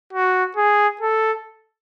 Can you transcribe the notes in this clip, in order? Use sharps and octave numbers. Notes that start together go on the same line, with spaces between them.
F#4
G#4
A4